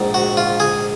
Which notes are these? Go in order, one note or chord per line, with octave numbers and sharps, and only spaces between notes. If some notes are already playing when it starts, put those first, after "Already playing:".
Already playing: A#1 G#2
F#4
F4
G#4